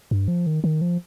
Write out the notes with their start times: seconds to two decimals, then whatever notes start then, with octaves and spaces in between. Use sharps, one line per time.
0.11 G2
0.28 F3
0.47 D#3
0.64 D#3
0.81 F3